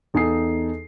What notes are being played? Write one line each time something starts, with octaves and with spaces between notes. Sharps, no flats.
E2 D#4 A4 G#5 D#6 C7